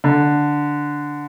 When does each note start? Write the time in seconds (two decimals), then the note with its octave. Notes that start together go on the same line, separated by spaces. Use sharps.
0.04 D3